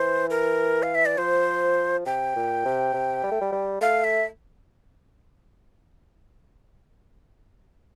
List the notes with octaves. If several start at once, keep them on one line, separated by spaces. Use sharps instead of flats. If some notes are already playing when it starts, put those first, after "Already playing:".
Already playing: E3 C5
A#4
F5
E5
D5
F3 C5
C3 G5
A#2
C3
C3
G3
A3
G3
G3
A3 F5
E5